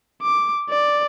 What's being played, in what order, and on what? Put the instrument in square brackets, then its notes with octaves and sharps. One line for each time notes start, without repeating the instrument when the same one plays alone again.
[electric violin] D6
D5